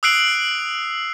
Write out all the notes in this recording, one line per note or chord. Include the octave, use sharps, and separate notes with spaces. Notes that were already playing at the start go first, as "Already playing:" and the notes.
D#6 E6 F#6 C7 D7 F#7